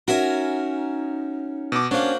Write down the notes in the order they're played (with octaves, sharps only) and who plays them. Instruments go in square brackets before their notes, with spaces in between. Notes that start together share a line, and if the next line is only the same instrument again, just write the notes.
[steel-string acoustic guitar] C#4 F#4 [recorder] D#4 [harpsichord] A#4 E5 G#5
[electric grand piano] B2 D6
[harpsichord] F#3 A#3 [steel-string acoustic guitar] C#4 [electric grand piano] D4 [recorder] C5